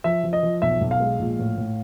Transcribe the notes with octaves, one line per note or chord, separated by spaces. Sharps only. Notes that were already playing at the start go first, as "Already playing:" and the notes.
F3 E5
F3
D#5
F3
B1 E5
B1
F5
G#3
A#1
A2
A2